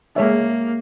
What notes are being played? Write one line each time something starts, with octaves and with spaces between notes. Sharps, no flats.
G#3 A#3 C#5 E5